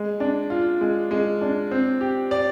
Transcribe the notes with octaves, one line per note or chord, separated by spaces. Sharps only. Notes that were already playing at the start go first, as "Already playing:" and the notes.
Already playing: G#3
D4
F4
G#3
G#3
D4
C4
G4
D5